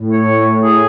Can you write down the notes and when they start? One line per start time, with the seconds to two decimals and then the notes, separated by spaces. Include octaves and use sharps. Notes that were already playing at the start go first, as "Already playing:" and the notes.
Already playing: A2
0.12 C#5
0.63 G#4